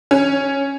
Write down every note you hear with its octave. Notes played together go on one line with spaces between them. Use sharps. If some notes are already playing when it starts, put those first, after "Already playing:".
C#4